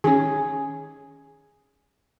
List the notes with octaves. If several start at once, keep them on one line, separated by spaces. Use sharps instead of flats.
D#3 C#4 G#4